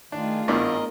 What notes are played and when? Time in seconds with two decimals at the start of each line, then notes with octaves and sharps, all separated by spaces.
0.12 D#3 A3 D4 F4 G#4
0.48 G#1 G2 B3 D4 E4 A#4 D5 D#5